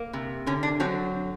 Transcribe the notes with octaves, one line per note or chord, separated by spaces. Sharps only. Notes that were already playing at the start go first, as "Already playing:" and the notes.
Already playing: A#3
C3
D3 C#4
D4
F#3 C4